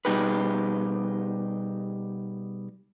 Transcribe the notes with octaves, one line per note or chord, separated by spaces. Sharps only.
B2 G3 D#4 G4 G#4 B4